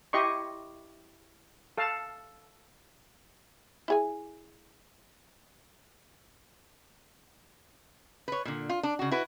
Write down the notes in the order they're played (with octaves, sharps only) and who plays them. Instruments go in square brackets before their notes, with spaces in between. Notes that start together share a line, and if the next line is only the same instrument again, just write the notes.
[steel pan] E4 G4 D#5 C6 C#6
A4 F5 A5
[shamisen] E4 G#4 G#5
[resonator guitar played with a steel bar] B4 C#5
A#2 D3
F4
D4
C#3 F#4
E4 F#4 B4